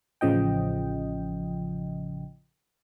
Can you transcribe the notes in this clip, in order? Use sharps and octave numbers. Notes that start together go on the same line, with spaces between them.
A1 C#3 F3 D#5 G5